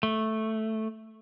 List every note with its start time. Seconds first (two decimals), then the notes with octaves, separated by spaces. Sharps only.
0.03 A3